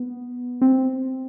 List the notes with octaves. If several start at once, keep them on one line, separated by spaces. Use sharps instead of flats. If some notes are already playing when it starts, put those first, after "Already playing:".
Already playing: B3
C4